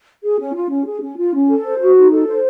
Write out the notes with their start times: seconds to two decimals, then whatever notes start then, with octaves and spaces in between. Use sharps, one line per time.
0.24 G#4
0.40 C#4
0.55 F4
0.70 C#4
0.86 G#4
1.01 C#4
1.17 F4
1.34 C#4
1.48 A4
1.64 C5
1.81 F#4
1.96 D#4
2.12 A4
2.27 C5